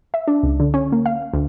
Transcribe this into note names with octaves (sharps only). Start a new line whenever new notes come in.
E5
D4
C#2
D3
C#4
A#3
F5
D2